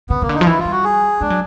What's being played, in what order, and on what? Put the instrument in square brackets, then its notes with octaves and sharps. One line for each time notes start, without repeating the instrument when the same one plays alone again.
[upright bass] C#3 [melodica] B3
[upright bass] C#3 [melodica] A#3
[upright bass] D3
[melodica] D#4
[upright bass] F3
[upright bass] E3 [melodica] E4
[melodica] F4
[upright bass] G3
[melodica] F#4
G#4
[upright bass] G#3 [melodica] D4
[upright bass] F#3